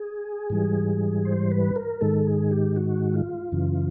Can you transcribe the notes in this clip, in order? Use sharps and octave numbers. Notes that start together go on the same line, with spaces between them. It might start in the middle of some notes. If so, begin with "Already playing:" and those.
Already playing: G#4
G#2 E3 G3
C5
B4
A#4
G#2 D#3 G#3 A4
G#4
G4
F#4
F4
F#2 C#3 E3